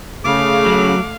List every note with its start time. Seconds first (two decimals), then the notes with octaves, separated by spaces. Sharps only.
0.25 C#3 A3 F5 D6
0.66 F#3